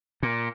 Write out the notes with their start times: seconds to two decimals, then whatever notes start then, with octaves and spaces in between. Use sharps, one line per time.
0.23 A#2